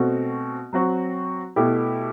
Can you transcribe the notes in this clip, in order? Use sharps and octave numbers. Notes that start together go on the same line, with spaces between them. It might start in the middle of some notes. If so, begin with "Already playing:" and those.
Already playing: B2 A3 C4 F#4
F#3 C4 F#4
B2 A3 E4 G4